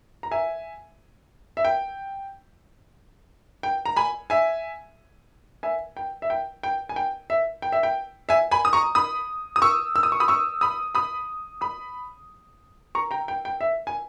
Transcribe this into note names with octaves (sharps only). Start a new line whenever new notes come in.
A#5
E5 G#5
E5
G5
G5
A#5
G#5 B5
E5 G#5
E5 G#5
G5
E5
G5
G5
G#5
G5
E5
G5
E5
G5
E5 G#5
G#5 B5
D#6
A#5 C#6
B5 D#6
D#6
C#6 E6
E6
D#6
C#6
B5 D#6
C#6 E6
B5 D#6
B5 D#6
B5 D#6
A#5 C#6
G5 A#5
G5
G5
E5
G#5